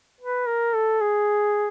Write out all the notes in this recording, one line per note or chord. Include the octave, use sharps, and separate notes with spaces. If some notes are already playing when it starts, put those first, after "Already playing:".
B4
A#4
A4
G#4